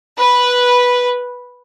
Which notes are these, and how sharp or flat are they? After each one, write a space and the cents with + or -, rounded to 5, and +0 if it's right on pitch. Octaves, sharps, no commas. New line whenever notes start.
B4 -5